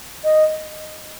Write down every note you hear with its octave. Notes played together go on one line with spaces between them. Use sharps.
D#5